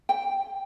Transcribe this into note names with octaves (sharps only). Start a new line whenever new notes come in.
G5